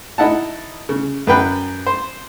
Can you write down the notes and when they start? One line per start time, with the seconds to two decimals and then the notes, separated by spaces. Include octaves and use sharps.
0.18 D#4 E4 F#5 A5
0.89 C#3
1.27 F#2 B4 G5 F#6
1.87 C5